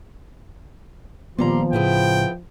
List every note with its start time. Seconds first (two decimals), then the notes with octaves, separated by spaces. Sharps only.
1.38 A#2 D#3 F3 G3 A#3 B3 A#5 C6
1.73 A2 C#3 B3 E4 G#4 G5